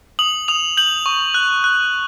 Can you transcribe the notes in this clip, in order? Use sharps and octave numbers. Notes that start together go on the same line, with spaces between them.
D#6 F#7
D#6 F7
G6 F#7
C#6
F#6
F#6